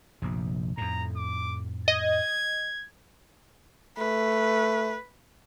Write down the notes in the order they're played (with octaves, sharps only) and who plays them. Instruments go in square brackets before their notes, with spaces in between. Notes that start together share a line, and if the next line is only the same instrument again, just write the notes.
[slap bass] F1 A#1 C3
[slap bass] F2 A2 [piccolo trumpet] A#5
[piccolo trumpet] D6
[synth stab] D#5 [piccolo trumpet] G#6
[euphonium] A3 [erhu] B4